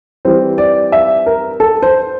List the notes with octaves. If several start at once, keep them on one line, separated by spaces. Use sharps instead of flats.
E3 G3 C4 C5
D5
E5
A#4
A4
C5